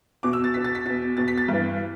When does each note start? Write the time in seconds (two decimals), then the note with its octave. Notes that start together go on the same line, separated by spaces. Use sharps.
0.23 E2 B2 D6
0.33 E6
0.44 A6
0.54 E2 B2 B6
0.64 A6
0.75 B6
0.86 E2 B2 A6
1.17 E2 B2 A6
1.28 B6
1.38 A6
1.48 G2 E3